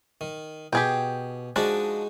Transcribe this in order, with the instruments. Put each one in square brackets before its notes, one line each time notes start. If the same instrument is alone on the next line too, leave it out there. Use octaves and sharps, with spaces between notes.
[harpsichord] D#3
[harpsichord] B2 [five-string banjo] G4 G#4 G5
[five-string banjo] F3 D4 [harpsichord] G#3 D#4 F#4